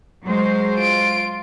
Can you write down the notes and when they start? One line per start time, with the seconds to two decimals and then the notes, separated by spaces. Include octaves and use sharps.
0.23 F#3 G#3 C5
0.77 F4 D7